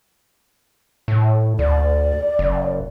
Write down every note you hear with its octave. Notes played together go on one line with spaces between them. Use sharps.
A2
D2 D5
F#1